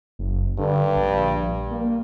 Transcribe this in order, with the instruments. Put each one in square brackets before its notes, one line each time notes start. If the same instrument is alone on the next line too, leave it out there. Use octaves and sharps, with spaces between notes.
[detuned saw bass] F#1
[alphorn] G2 [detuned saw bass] D3
[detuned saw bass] A#1
A#3